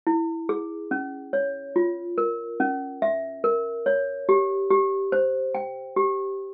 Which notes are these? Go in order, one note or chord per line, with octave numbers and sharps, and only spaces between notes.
E4
G#4
C#4
C#5
F4
A#4
C#4
E5
A#4
C#5
G4
G4
C5
G5
G4